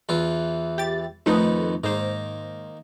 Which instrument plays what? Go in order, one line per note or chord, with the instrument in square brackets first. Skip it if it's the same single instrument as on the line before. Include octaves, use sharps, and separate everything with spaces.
[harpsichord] E2 E3 F4
[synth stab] G4 A6
[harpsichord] F2 D#3 B3 [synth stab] A3 D#4
[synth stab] G#2 C5 [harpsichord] D#3 A#3